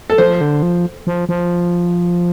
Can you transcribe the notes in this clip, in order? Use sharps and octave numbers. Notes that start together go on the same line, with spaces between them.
A4
F3 C5
D3
F3
F3
F3